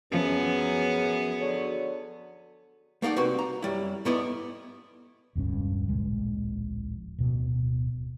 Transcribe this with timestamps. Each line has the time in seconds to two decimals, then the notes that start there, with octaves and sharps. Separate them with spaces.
0.12 F#2 F3 B3 C#4 G#4
1.40 D3 F#3 C#5
3.02 A3 A#3 D#4 D5 F#5
3.16 C2 C4 F#4 B4
3.39 A#5
3.62 F#2 G3 E4
4.05 G#2 A3 B3 E4 D5 D#5
5.35 E1 C#2 G2 C#4
5.88 D1 A#1 G#3
7.18 D1 B2